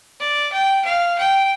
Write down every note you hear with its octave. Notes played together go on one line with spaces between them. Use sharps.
D5
G5
F5
G5